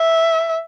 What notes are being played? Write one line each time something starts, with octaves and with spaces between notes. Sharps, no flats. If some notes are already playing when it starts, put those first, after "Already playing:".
Already playing: E5